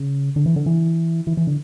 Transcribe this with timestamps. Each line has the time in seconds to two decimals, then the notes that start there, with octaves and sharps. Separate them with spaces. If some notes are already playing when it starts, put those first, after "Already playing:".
Already playing: C#3
0.36 D3
0.46 E3
0.56 D3
0.66 E3
1.27 E3
1.37 E3
1.47 D3